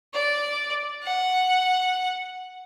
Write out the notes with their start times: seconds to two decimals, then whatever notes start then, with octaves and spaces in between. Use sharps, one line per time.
0.14 D5
1.03 F#5